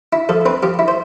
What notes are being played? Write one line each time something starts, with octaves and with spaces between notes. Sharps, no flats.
E4
F3 A4
C4 B4
F3 G4
E4
C5